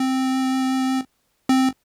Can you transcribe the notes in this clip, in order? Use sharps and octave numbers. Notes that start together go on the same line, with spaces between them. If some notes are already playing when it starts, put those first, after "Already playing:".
Already playing: C4
C4